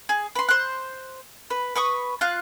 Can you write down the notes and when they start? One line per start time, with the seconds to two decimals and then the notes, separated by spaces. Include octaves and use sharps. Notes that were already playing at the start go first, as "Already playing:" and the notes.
0.09 G#4
0.35 B4 C6
0.49 C5 F#6
1.50 B4
1.76 B4 C#6 D#6
2.21 F4 F5 F#6